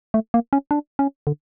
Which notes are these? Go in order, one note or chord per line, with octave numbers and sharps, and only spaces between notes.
A3
A#3
C#4
D4
C#4
D3